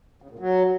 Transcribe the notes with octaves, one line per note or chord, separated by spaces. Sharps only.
C#3
A#2
F#3